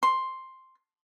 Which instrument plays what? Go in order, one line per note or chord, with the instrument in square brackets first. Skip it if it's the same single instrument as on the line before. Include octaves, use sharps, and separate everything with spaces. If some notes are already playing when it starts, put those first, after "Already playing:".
[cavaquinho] C6